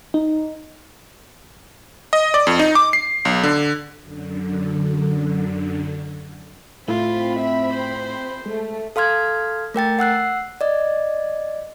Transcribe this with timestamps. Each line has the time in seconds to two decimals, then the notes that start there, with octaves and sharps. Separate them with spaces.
0.14 D#4
2.13 D#5
2.34 D5
2.47 F2
2.59 D#4
2.75 D6
2.93 C7
3.25 B1
3.43 D3
4.00 F#2 D3
6.88 A2 A3 C4 E4 F4 B5
7.39 E5
7.73 C5
8.46 G#3 A3
8.96 A4 F5 C6 F6 G#6
9.74 A3 A#4 G5 A6
9.99 F#5 E6 F#6 C7
10.61 D5 D#5